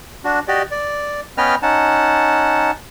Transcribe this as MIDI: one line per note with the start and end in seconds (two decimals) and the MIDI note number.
0.24 0.40 62
0.24 0.40 66
0.48 0.63 66
0.48 0.63 67
0.48 0.63 74
0.48 0.63 75
0.71 1.21 74
1.38 1.55 59
1.38 1.55 61
1.38 1.55 71
1.38 1.55 75
1.38 1.55 79
1.38 1.55 89
1.63 2.71 61
1.63 2.71 63
1.63 2.71 78
1.63 2.71 81